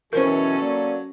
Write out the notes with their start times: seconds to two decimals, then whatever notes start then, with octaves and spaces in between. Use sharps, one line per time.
0.13 E2 B2 E3 F#3 C#4 A4 A#4 C5
0.60 A#3 D5